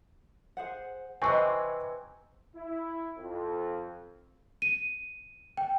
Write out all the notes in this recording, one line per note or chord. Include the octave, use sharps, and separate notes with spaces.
G#4 C5 F#5
C3 E3 C4 B4 C5 D#5 G#5 C#6
E4
F2
D#7
G5